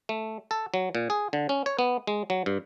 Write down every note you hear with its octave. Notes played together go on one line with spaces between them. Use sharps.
A3
A4
F#3
A#2
G#4
D3
C#4
C#5
B3
G#3
F#3
G2